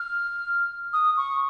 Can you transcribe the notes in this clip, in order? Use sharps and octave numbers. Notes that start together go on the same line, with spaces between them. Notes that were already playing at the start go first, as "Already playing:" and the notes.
Already playing: F6
D#6
C#6